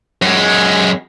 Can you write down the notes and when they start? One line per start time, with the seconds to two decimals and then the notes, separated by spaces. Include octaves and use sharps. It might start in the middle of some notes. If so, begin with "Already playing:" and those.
0.22 F#2 G#3